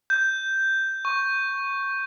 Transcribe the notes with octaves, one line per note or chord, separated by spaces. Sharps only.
G6
C#6